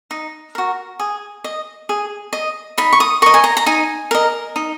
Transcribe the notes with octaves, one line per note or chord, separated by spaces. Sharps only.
D#4
F#4 A#4
G#4
D#5
G#4
D#5
D#4 B5
C#6
D#6
A#4 D#5 C#6
G#5
A#5
A#5
D#4 G#5
A#4 D#5
D#4